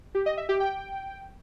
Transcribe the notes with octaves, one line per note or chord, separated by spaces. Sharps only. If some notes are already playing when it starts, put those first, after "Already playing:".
G4
D#5
E5
G4
G5